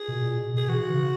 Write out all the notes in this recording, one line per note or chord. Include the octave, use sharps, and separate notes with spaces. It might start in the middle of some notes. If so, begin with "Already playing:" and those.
Already playing: G#4
B2
A#2
B2
B2 G#4
E3 F#4
C#3